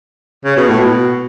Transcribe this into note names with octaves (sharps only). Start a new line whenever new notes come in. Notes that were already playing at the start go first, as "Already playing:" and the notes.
C#3
B2
A2
B2